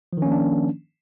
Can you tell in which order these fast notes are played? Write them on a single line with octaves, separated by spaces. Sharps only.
F3 D#3 C#4 A#3 D4